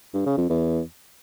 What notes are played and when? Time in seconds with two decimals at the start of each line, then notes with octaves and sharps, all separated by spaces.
0.14 G2
0.26 C#3
0.38 F2
0.49 E2